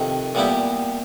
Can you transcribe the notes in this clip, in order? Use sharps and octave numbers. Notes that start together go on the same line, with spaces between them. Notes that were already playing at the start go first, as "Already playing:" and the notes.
Already playing: F2 C3 D#3
A#2 G3 B3 E4 G4